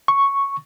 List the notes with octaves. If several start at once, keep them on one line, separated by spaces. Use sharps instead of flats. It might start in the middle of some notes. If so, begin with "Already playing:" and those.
C#6